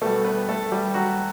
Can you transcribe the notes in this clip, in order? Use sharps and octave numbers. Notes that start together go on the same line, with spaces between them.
B2 G3 A3 A4
B3 B4
A3 A4
G3 G4
F#3 F#4